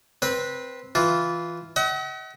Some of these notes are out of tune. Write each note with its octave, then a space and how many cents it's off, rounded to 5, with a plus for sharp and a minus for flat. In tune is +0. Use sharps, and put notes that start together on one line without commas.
C4 +0 B4 -20
E3 +0 F4 +0
D#5 +45 F#5 +35